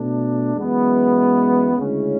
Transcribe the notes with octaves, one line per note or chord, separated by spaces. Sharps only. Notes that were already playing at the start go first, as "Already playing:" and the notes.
Already playing: B2 A3 D4
F#2 E3 G#3 B3
D2 C#3 G#3 C#4 E4